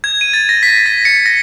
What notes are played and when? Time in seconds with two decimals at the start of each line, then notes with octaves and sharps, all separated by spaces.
0.04 G#6
0.21 D#7
0.33 A6
0.49 A#6
0.63 B6
0.86 A#6
1.05 C#7
1.26 A#6